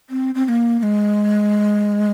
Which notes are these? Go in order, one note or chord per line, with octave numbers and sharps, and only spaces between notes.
C4
C4
C4
A#3
A#3
G#3